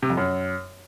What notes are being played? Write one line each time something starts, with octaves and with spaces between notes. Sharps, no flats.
C3
F2
F#2